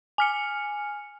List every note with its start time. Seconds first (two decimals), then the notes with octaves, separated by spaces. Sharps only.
0.18 G#5 F6 C#7